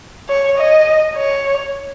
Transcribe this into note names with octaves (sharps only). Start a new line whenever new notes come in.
C#5
D#5
C#5